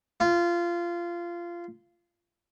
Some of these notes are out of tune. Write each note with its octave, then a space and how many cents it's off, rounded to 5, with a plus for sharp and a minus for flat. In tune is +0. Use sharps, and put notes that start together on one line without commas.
F4 -20